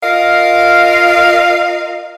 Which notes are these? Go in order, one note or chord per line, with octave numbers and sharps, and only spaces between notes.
F4 A#4 D#5 F5